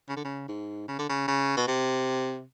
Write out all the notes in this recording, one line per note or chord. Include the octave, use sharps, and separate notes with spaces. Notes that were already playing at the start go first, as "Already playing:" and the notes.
C#3
D3
C#3
G#2
C#3
D3
C#3
C#3
B2
C3